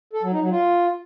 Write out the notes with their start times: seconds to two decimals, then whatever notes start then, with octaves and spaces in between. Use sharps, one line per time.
0.13 A4
0.23 F#3
0.32 D#4
0.42 F#3
0.51 F4